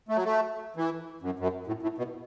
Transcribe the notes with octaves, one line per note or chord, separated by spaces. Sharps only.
A3
F#3
A3
E3
F#2
F#2
A2
A2
B2